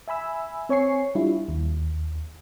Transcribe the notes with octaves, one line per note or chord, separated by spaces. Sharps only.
E5 G#5 B5 E6
C4 C#5 G#5 C#6 C7
G3 D4 E4 F4
D#2